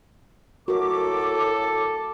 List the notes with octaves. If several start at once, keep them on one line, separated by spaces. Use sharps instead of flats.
F#2 A2 F#4 A4 A#4 D6